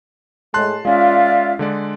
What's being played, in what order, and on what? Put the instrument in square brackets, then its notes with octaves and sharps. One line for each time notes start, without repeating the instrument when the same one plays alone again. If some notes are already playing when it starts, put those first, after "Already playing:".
[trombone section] A2 G#3 [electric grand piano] A5 C6 F#6
[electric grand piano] G#3 C#4 [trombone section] F4 [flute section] D5 E5 F5
[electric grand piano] D3 G#3 D5